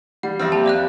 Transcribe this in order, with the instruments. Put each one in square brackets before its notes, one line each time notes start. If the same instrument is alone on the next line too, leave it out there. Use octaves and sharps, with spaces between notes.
[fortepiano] G3 [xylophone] F#5
[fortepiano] F2 C4 [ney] G4 [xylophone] E5 F6
[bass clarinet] A#3 [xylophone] A5 B5
[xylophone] D5 F5 F#6